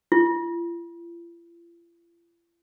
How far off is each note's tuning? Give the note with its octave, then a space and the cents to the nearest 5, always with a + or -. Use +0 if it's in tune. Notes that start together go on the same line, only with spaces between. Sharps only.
F4 -45